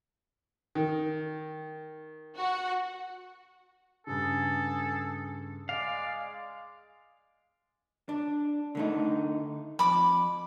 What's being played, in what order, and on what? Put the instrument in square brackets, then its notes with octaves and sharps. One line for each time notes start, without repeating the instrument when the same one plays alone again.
[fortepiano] D#3
[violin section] F#4 F#5
[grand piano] G2 C#3 [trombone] G#4 [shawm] A4
[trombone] G#3 [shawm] D5 [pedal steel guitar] F5
[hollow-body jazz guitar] D4
D3 A3 D#4
[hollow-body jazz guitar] F2 [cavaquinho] B5 D6